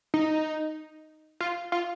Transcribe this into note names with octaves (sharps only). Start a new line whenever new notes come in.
D#4
F4
F4